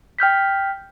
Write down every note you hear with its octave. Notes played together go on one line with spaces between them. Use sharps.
G5 F6 G6 B6